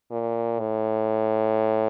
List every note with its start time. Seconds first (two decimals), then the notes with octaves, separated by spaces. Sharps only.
0.11 A#2
0.60 A2